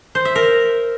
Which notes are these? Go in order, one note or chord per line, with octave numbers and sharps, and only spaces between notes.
C5
E5
A#4